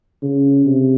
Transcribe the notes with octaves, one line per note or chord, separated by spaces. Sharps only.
C#3
C3